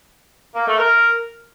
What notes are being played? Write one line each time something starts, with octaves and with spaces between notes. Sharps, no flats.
A#3
A3
A#4